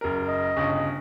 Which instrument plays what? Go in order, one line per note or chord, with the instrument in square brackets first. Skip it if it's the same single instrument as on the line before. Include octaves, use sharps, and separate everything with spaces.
[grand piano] F#1 A#4
[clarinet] D#5
[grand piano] G1 C#3